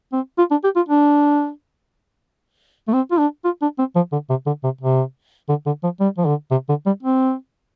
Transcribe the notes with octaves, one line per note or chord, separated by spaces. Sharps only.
C4
F4
D4
G4
F4
D4
A3
C4
F4
D4
F4
D4
C4
F3
D3
C3
D3
C3
C3
D3
D3
F3
G3
F3
D3
C3
D3
G3
C4